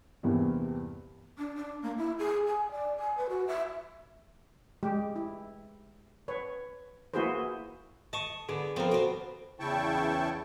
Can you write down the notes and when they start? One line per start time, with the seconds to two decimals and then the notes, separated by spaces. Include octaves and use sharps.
0.23 E2 G2 C3 E3 A#3 C4
1.38 D4
1.56 D4
1.83 A#3
1.98 E4
2.19 G#4
2.47 G#5
2.71 D5
2.99 G#5
3.17 B4
3.29 F#4
3.47 E5
4.83 G#3 G4
5.16 E4
6.28 B4 C#5
7.14 A#3 E4 F#4 G#4 B4 C5
8.13 D#5 A5 C#6
8.49 D3 B3 G#4
8.76 F3 B3 C4 A4 A#4
8.91 D#2 B2 B3 C5
9.60 E2 C#3 E4 G5 A5 C#6